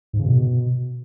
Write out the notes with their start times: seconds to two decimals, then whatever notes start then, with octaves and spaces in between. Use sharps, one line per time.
0.13 G#2
0.19 C#3
0.25 B2